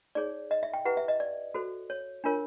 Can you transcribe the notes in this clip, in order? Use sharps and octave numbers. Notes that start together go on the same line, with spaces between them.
D#4 G#4 C#5 D5
D#5
E5
G5
E4 G4 B4 F#5
E5
D#5
D5
F#4 A4 C5
C#5
D4 F4 A#4 C#5